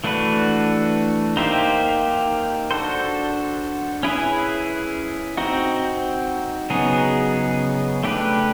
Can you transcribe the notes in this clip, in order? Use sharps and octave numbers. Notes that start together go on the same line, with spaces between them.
E3 A3 D4 F#4 B4
A#3 D#4 G4 C5 E5
D4 F#4 A4 C5
C#4 E4 G#4 B4 E5
C4 D#4 F#4
C#3 F#3 B3 D#4 G#4
A3 D4 G4 B4